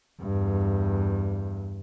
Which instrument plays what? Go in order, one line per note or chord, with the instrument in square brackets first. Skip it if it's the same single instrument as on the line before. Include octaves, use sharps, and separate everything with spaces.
[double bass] E2 G2